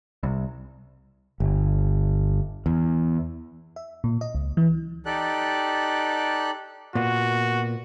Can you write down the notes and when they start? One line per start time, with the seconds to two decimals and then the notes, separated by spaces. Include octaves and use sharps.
0.23 C2
1.40 G1
2.66 E2
3.76 E5
4.04 A#2
4.21 D#5
4.35 C#2
4.57 E3
5.06 D#4 G4 A4 D5 F#6
6.95 A#2 A#3 B3 F#4